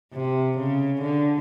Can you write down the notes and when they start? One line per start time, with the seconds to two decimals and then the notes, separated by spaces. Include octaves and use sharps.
0.14 C3
0.58 C#3
1.01 D3